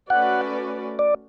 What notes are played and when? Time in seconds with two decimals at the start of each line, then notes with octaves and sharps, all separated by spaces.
0.10 A3 C#4 F#4 B4 D5 F#5
0.99 D5